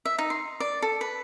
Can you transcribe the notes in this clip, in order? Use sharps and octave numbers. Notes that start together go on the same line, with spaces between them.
E5
D#4
C6
D5
A4
B4